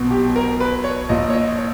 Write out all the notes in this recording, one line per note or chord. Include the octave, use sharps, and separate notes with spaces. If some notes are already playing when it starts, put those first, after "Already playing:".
Already playing: B1 B2
G4
A#4
B4
C#5
A#1 A#2 D#5
C#5
D#5
C#5